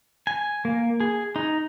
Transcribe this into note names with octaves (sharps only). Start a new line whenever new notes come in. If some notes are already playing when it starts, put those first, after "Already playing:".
G#5
A#3
G#4
D#4